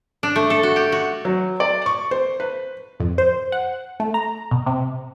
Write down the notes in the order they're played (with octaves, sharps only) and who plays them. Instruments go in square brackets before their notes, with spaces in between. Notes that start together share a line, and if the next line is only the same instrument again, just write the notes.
[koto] D4
A3
A4
F#4
G4
F#4
[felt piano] F#3
D5
C#6
C5
B4
[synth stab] F2
C5
F#5
A3
A#5
B2
C3